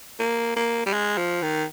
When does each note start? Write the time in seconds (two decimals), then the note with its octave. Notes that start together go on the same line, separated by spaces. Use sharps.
0.20 A#3
0.56 A#3
0.86 G3
0.93 G#3
1.18 F3
1.42 D#3